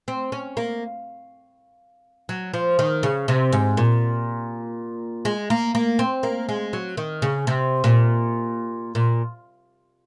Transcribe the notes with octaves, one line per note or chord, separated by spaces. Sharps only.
C4
C#4
A#3
F#3
F3
D#3
C#3
C3
G#2
A#2
G#3
A#3
A#3
C4
A#3
G#3
F#3
D#3
C#3
C3
A#2
A#2